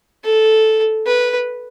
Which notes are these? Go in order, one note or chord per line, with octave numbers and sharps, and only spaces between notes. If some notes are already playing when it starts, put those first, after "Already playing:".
A4
B4